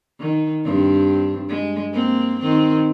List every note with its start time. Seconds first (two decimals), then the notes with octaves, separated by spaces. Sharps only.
0.20 D#3
0.64 G2 C4 D4
1.48 G#3
1.93 A#3 C4
2.40 D#3 C4